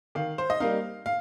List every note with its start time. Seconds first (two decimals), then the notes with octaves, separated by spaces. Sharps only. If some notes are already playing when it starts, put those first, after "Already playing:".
0.15 D#3 F5
0.38 C5
0.50 D#5
0.60 G3 A#3 D#4 F5
1.06 F5